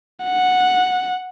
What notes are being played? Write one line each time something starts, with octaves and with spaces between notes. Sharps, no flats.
F#5